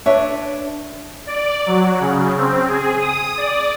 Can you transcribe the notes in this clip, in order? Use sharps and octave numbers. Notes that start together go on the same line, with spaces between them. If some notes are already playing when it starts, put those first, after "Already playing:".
D4 B4 C#5 E5
D5
F#3
C#3
C4
G#4
D#6
D5